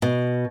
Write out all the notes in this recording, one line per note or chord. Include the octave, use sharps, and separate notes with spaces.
B2